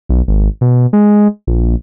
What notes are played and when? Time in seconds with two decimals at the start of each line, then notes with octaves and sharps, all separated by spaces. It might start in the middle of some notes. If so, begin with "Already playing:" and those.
0.09 B1
0.28 G#1
0.61 B2
0.93 G#3
1.47 A#1